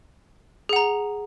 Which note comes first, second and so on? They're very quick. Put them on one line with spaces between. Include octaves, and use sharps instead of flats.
G#4 F#5 A#5